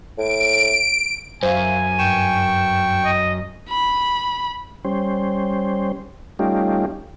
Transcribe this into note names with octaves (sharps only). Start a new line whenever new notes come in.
A2 D7
F#2 C5 E5 F5 G#5
G2 G5 C#6 G6 E7
D#5
B5
G3 C#4 C5
G3 A3 C#4 D#4 F4 G4